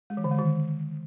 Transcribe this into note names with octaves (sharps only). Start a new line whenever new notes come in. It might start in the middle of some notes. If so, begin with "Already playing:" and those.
G#3
E3
D3
G#3
D#3